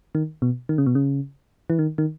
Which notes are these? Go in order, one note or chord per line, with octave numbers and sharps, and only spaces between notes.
D#3
B2
D#3
C#3
B2
C#3
E3
D#3
D#3